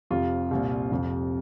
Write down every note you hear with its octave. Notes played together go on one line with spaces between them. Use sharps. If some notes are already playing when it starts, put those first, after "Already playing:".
F1 F2 C3 F4
C2 A#2
F1 F2 C3